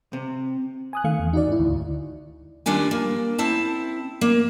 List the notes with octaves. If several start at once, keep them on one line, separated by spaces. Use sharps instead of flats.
C3
G#5 D#6 F#6
D#3 A3 F5 C#7
E2
D#4 F#4 D5
G#2 E4
D2
D#2 G3 D4 F4 G#5
A#3
C4 E4 A5
A#3